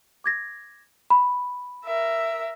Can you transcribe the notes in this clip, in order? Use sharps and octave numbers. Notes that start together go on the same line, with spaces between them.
D6 G#6 A#6
B5
A#4 E5